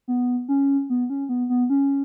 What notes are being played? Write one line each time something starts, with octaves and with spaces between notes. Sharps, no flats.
B3
C#4
B3
C#4
B3
B3
C#4